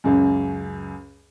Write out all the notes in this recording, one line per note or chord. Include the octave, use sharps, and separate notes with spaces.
C#2 F#2